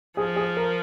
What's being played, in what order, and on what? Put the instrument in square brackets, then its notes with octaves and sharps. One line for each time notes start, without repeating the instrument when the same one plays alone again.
[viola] F3 [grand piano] G#4
[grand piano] G#4
A#4